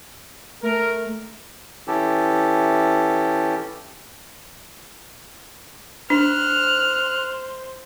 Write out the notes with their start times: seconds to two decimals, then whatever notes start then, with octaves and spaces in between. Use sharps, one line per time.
0.63 A3 A#4
1.87 E3 C#4 E4 G4 A4
6.10 D4 C5 F6 F#6